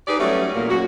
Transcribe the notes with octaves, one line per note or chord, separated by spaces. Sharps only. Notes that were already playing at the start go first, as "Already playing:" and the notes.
D#4 G4 G#4 B4 D5
F#3 G3 A3 C#4
E2 A#2 A#3
F#2 F#4